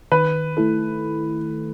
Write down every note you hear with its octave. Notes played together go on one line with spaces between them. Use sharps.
D#3 B4
A3 E4 A4